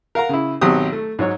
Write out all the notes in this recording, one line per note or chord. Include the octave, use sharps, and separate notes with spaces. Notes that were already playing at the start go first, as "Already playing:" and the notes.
A#4 F5 F#5 A#5
C#3 E4
G#1 B2 F#3 C4 G4 D#6
A3
G#2 F#3 C#5